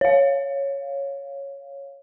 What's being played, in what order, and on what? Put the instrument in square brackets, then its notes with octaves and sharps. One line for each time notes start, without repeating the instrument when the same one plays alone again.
[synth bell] C#5 F5